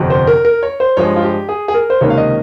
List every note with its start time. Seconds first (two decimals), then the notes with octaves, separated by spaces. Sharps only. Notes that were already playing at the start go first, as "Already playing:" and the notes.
Already playing: G1 F2 C3
0.10 C5
0.27 A#4
0.45 A#4
0.63 C#5
0.80 C5
0.97 G2 F3 G#3 C#5
1.16 F4
1.22 G4
1.49 G#4
1.68 G#4
1.74 A#4
1.90 C5
2.01 C#2 C3 D#3 A#3 C#4 C#5
2.10 F5
2.18 D#5